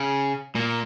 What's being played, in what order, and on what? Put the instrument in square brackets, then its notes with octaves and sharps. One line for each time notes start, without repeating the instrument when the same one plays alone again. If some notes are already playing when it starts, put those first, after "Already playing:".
Already playing: [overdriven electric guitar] C#3
[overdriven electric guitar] A#2 [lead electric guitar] A#3